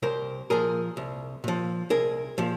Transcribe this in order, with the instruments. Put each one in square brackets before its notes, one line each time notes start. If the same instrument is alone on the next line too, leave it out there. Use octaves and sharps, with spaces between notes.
[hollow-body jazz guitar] C2 A#4 C5
A#2 F3 G#4 A#4
C2
A#2 F3
C2 G#4 A#4
A#2 F3